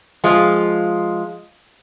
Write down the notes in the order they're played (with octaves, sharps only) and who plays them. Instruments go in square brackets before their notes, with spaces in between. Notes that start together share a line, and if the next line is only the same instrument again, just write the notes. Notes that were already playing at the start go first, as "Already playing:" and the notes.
[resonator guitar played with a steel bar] F3 G#3 F4